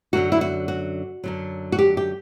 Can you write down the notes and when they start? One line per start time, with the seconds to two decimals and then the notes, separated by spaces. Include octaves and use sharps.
0.13 F#2 D3 F#3 F#4
0.32 E4
0.41 F#4
0.68 F#4
1.24 F#2 D3 F#3
1.72 F#4
1.79 G4
1.97 G4